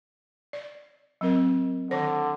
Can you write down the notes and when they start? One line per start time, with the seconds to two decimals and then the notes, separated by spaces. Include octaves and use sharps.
0.53 D5
1.21 F#3 C4 A#4
1.91 D3 D#3 C5